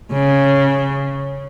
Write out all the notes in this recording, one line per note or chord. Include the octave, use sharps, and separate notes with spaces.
C#3